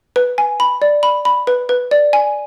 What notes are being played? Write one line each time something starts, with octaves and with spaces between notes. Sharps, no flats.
B4
G#5
B5
D5
B5
B5
B4
B4
D5
G#5